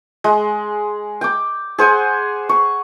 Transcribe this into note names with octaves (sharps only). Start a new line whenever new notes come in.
G#3
G5 D6
G#4 C5 F#5 G#5
C#6